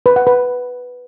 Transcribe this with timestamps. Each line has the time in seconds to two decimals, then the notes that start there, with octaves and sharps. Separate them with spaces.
0.06 B4
0.16 F#5
0.27 B4